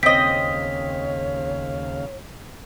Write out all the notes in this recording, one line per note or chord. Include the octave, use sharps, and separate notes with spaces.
D#2 C#3 C4 C#5 D#5 F5 B6